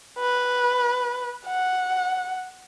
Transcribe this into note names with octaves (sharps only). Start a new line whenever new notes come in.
B4
F#5